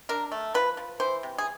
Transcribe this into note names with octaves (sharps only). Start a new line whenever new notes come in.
D4 A#4
A3
F3 B4
F3
E3 C5
C3
G#4